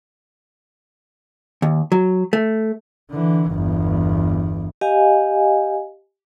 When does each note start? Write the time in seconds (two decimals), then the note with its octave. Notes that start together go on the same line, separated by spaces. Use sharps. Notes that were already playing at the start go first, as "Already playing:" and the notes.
1.62 D#2
1.92 F#3
2.33 A3
3.11 D3 E3
3.52 G1 E2
4.81 G4 D#5 F5 G#5